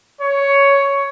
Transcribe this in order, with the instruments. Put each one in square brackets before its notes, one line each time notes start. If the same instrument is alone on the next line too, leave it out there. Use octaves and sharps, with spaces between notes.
[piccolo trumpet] C#5